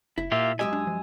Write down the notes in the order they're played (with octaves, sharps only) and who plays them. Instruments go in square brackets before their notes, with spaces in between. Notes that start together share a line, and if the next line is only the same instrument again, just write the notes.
[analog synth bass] F#1 [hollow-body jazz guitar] E4
[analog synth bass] A#2 [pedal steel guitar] A#3 F4 G4 [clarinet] E5
[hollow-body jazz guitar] F#2 G4 D#5 [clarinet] G#3 [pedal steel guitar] G#5 D#6 E6
[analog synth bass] D4
F3